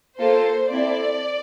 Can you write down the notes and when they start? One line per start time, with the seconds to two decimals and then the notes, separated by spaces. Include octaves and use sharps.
0.17 A#3 F4 A4 C5
0.71 C4 E4 A4 D5